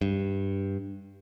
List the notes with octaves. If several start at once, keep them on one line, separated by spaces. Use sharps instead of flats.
G2